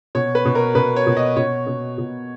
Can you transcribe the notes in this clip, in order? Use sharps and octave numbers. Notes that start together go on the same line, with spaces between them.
B2 C#5
B4
B2
A#4
B2 B4
C#5
B2
D#5
B2 C#5
B2
B2